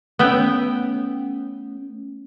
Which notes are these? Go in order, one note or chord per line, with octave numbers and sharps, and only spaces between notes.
A3 B3 C#4 E5 G5